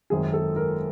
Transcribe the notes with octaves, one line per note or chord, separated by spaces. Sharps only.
G#1 F#2 D#3 G#3 G#4
A4
A#4